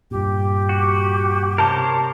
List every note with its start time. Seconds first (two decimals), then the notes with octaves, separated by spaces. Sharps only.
0.11 G2 A#2 G4
0.69 F#4
1.58 C3 A#4 C5 C#5 A5